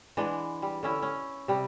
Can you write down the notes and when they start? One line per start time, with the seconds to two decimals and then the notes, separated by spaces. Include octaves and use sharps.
0.17 E3 G#3 B3 D4
0.62 G3
0.83 D3 C#4 E4
1.02 C#4
1.48 C3 G3